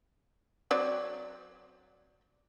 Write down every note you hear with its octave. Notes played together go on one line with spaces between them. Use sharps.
F#3 C4 D5